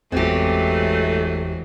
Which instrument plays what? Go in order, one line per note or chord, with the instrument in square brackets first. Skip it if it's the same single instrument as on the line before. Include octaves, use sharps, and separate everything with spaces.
[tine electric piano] G1 E2 [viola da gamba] E3 F#3 G#3 [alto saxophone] A3 [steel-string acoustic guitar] C4 G4